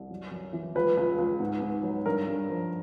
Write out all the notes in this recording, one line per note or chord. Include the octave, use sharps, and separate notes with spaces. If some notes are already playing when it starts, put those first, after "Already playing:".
Already playing: C2
F#2
F#2
E3
C#2 B4
C#2
C#2
G#2
G#2
F#3
G2 A#4
G2
F3